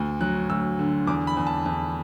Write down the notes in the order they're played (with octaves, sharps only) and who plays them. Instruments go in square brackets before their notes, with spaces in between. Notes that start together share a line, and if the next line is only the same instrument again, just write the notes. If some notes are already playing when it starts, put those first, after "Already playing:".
Already playing: [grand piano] D2
F#3 F#6
D2 E6
D3
E2 D6
B5
E2
A5
E2